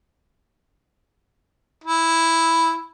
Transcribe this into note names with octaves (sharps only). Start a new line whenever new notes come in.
E4